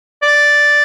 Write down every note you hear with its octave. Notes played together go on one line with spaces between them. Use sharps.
D5